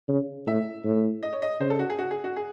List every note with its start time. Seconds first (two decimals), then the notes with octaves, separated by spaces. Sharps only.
0.08 C#3
0.46 A2 E5
0.85 A2
1.23 D#5
1.33 C#5
1.42 D#5
1.60 C#3 C5
1.70 A4
1.79 F#4
1.90 G#4
1.99 F#4
2.11 G#4
2.24 F#4
2.36 G#4